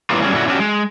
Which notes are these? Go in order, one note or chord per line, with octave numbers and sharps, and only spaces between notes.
A2 E3 G3 A#3 B3 F4
F#3 G3 A#3 C#4 F4 G#4
A#2 D3 C#4 E4 F#4
A3 C#4 D4 F#4 G4
G#3